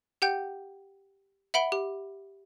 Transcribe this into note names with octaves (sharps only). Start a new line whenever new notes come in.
G4 F#5 G5 G6
E5 F#5 B5 D7 G7
G4